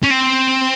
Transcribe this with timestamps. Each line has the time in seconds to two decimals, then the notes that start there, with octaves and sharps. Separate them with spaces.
0.04 C#4
0.11 C4